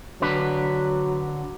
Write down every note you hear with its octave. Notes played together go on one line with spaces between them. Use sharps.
D3 F#3 D4 B4